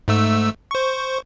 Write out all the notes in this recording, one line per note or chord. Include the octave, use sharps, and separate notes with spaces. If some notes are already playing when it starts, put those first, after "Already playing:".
G#2 A3 E6
C5 C#6